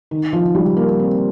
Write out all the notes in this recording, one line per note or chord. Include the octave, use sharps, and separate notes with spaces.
D#3
F3
G3
A#3
C4